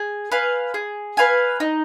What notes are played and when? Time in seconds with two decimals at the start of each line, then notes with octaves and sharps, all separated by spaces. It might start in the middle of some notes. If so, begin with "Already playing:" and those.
Already playing: G#4
0.32 B4 F5 G#5
0.74 G#4
1.17 B4 F5 G#5
1.60 D#4